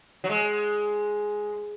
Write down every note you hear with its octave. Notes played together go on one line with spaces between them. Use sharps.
F#3
G#3